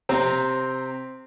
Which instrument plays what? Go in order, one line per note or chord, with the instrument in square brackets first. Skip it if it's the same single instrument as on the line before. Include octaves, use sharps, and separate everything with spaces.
[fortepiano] C3 C4 A#5